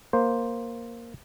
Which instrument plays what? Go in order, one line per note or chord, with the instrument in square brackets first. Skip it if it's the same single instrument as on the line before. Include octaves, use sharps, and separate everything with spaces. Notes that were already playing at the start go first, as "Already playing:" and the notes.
[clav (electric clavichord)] A#3 C5